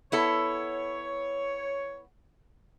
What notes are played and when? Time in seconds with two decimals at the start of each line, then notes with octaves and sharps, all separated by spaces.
0.12 B3 E4 A4 C#5